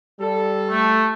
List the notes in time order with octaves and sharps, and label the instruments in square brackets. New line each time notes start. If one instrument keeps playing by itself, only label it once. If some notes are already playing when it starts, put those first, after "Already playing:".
[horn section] G3 A4
[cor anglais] A3